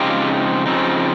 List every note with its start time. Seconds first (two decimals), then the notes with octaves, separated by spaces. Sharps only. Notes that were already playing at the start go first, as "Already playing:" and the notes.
Already playing: C#3 F3 G#3 C4 D#4 F4 G4
0.66 C#3 F3 G#3 C4 D#4